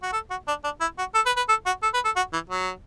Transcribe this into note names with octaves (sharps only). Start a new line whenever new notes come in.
F#4
A4
F#4
D4
D4
E4
F#4
A4
B4
B4
A4
F#4
A4
B4
A4
F#4
E3
F#3